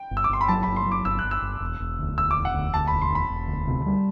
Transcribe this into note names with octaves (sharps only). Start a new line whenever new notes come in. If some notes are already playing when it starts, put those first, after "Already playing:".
Already playing: G5
G1
E6
D6
G1 C6
B5
F#3 A5
G1 B5
C6
F#3
D6
G1 E6
F#6
G1
E6
G1
E1
E1
D2
E1 E6
E1 D6
F#5
D2
D2 A5
E1 B5
C6
E1 B5
E1
D2
C3
G3